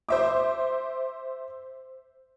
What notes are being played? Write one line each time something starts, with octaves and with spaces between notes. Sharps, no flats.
C5 E5 D6